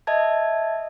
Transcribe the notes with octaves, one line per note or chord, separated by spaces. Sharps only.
D#5 E5 A5 G#6